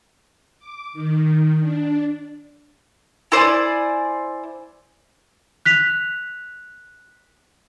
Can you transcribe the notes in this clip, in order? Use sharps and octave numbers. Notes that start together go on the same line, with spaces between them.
D6
D#3
D4
E4 C5 D5 G#5
F#6 B6 F7